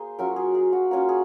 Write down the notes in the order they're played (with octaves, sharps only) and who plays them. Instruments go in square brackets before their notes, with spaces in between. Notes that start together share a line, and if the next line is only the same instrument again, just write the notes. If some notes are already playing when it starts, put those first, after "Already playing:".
Already playing: [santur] A#3 G#4 C5
F#3 C#4 F4 A#4
G#4
G#4
F#4
A#3 C#4 F4 F#4
G#4